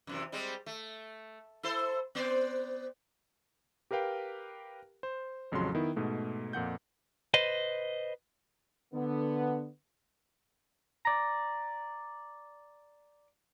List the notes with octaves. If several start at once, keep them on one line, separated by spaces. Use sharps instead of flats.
F#2 C3 E3
G3 G#3 C4
A3
E4 A4 C5
B3 C5 D5
G4 A#4 B4 F5 G5
C5
A1 F2 C#3 F#3 C6
D#3 B3 E4
G#2 B2 A3
F2 A#2 F#5 G6
B4 C5 D#5
D3 B3
D5 A#5